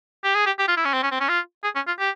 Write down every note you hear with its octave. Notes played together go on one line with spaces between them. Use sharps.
G4
G#4
G4
G4
F4
E4
C#4
C4
C#4
C4
C#4
F4
G#4
C#4
F4
G4